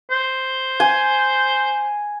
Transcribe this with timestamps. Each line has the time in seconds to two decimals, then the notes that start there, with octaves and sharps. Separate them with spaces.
0.10 C5
0.80 G#5